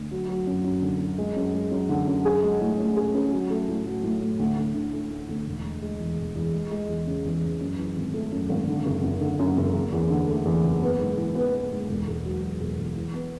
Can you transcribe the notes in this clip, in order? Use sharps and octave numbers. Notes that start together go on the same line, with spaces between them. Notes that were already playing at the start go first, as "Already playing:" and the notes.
Already playing: D2
F#3
F#3
F#2
F#2
D3
F#2
G#3
F#2
G#3
F#2
D3
F#2
G#4
G#3
A2
A2
G#4
C#4
F#3
A3
A2
F#3
A2
A2
D2
D2
D3
A3
A3
D2
E1
G#3
G#3
E2
E1
E2
G#3
G#3
E2
C#3
E2
C#3
F#2
E3
G#1
A3
F#2
G#1
D3
F#1
F#1
D3
F#2
F#1
F#1
E2
D3
A3
E2
F#1
B3
G#2
E3
B3
B3
G#2
E1
E1
F#3
F#3
E1
E1
E3
B3